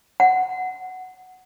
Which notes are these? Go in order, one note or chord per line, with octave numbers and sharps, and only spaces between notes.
F#5